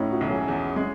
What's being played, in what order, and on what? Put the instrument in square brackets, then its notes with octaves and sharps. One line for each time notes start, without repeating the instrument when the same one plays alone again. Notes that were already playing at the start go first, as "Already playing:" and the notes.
Already playing: [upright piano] A2 [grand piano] C#4 D#4 E4
[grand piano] F#4
[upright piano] B1
[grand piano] G#4
[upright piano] E2
G#3